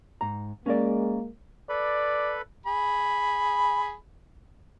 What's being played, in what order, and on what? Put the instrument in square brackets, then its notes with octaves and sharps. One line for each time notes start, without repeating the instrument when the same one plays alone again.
[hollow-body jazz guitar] G#2 A#5
[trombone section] G#3 A#3 [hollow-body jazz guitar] C#4 A#4 D5
[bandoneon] A4 B4 B5 [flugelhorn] D5
[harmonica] G#4 B5